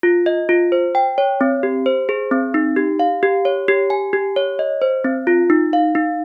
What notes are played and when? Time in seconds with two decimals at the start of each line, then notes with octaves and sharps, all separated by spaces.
0.03 F4
0.26 D#5
0.49 F4
0.72 C5
0.95 G5
1.18 C#5
1.41 C4
1.63 G4
1.86 C5
2.09 G#4
2.31 C4
2.54 D#4
2.76 G4
2.99 F5
3.23 G4
3.45 C#5
3.68 G4
3.90 G#5
4.13 G4
4.36 C#5
4.59 D#5
4.82 C5
5.04 C4
5.27 F4
5.50 D#4
5.73 F5
5.95 D#4